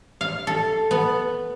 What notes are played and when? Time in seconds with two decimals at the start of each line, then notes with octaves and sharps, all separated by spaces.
0.21 F5
0.47 A4
0.91 B3